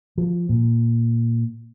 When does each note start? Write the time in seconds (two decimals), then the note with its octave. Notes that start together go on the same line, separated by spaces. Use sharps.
0.18 F3
0.49 A#2